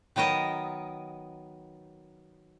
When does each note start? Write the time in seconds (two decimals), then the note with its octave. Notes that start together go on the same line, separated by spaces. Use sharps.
0.16 D#3 F#3 B3 A#4 D#5